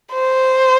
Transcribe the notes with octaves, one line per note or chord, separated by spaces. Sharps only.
C5